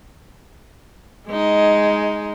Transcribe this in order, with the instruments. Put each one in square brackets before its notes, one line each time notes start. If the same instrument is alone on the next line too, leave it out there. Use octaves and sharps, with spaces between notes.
[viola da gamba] G#3 D#4